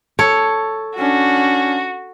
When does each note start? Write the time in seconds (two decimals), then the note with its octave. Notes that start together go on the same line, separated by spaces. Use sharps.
0.19 A4 C#5
0.98 C#4 D4 F#4